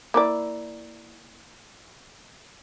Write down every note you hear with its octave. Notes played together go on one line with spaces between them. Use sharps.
A#3 E4 D5